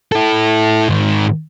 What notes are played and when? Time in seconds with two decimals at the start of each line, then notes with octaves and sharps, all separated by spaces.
0.12 E4 A4
0.89 G#2 D#3